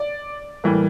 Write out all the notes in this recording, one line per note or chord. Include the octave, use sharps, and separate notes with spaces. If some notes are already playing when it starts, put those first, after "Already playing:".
Already playing: D5
A2 E3 G3 A#3